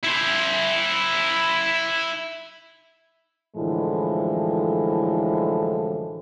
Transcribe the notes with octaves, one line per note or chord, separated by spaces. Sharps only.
E4 C5
F#2 A2 D3 E3 F3 G#3